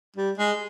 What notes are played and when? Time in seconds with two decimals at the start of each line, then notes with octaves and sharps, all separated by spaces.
0.16 G3
0.38 G#3